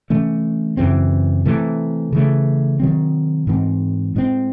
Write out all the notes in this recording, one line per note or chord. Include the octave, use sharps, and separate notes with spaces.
C3 E3 A3 C#4
F#2 C#3 E3 C4
C3 E3 A3
C#3 E3 A3
C3 D#3 F#3 C4
G#2 E3 C4
A2 G#3 C4